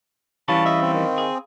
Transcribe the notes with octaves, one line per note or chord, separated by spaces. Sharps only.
E3 G3 C#4 F5 A5 B5 C#6
D#5 E5
C4
D#3
G#4